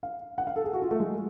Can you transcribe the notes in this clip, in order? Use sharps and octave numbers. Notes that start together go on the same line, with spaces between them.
F5
F#5
F5
A4
G#4
F#4
F4
A3
G#3